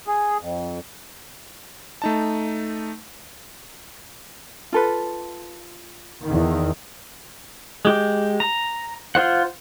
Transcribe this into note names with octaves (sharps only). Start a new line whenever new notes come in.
G#4
F2
A3 D#4 A5
F4 A4 B4
E2 D#3
G#3 G4
A#5
F4 C5 F#5